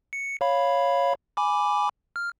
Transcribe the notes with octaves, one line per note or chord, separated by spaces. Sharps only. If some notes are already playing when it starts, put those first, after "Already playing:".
C#7
C#5 F5 B5
G#5 B5 D6
F6